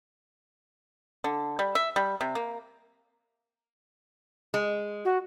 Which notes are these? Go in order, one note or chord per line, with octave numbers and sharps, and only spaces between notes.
D3
G3
E5
G3
C3
A#3
G#3
F#4